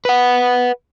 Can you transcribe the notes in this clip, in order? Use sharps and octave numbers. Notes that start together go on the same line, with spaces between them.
B4 F#5